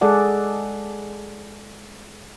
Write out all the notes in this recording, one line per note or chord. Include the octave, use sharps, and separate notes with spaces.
G#3 G#4 A4 D5 F#5